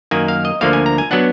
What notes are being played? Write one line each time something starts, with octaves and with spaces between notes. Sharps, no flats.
F#2 D#3 A#3 G#5
F5
D#5
D2 D3 F3 A#3 F5
G#5
A#5
G#5
F#3 B3 D4 F#5